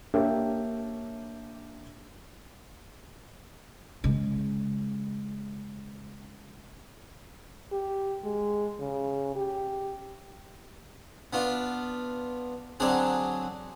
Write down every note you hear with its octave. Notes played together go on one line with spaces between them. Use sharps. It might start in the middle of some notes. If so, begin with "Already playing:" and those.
A#3 D4 G4 C#5 E5 G5
C#3 G#3
G4
G#3
C#3
G4
B3 D4 F4
D3 F#3 C4 D4 G#4